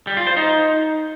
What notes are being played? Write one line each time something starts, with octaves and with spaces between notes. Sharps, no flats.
G3
F4
C5
D#4